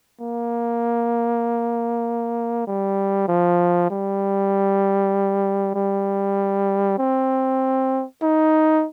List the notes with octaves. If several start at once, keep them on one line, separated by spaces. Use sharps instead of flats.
A#3
G3
F3
G3
G3
C4
D#4